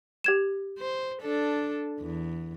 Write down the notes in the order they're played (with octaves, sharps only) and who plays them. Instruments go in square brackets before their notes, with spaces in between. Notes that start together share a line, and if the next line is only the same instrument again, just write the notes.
[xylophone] G4 G#6 E7
[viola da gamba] C5
D4 A4
E2